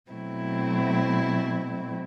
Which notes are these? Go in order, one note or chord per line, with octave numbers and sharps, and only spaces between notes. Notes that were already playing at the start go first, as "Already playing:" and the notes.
B2 F#3 A3 C4 E4